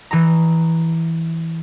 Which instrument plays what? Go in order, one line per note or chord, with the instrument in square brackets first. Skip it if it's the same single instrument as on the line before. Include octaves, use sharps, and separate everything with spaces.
[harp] E3 A#5